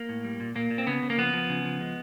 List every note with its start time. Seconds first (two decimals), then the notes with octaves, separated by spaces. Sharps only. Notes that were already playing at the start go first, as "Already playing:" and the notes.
Already playing: A#3
0.09 A2
0.24 G3
0.40 A#2
0.55 A#2 A#3
0.70 A#2
0.78 C4
0.87 C#3 B3
1.03 C#3
1.10 A#3
1.18 F3 B3
1.33 F3
1.49 C#3
1.65 F3
1.81 G#3